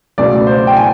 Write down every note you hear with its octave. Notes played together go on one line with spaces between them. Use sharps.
C#2 B2 F#3 A3 D5
C5
G5
G#5